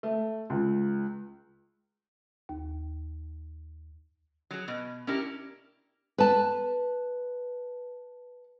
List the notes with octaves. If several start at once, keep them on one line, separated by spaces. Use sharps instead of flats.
A3
C#2
D#2
F#3 G#4
B2
C#4 D4 E4 G4 A#4
B4 A5